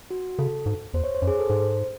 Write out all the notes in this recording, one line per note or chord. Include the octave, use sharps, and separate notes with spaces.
F#4
C#3 A4
G#2
E2 C5
C#5
C5
F#2
G#4
A4
G#2 C5